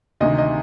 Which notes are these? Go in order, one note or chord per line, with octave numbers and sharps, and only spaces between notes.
D2 C3 D#3 D#5
D#5